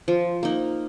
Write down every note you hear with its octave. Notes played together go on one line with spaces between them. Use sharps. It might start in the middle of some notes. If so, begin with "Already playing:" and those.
F3
A#3 D#4